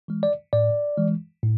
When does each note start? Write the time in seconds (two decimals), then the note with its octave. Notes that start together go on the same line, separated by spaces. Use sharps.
0.08 E3 G#3
0.23 D5
0.53 A2 D5
0.97 E3 G#3
1.43 A2